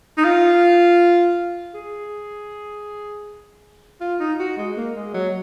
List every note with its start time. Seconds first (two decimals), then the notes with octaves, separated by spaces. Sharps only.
0.18 D#4
0.24 F4
1.75 G#4
4.01 F4
4.20 D#4
4.39 F#4
4.57 G#3
4.77 A#3
4.96 G#3
5.14 F#3